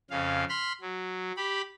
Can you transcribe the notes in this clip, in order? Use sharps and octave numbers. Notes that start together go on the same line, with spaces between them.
F2 C#3 F5
B5 C6 F6
F#3
G4 B5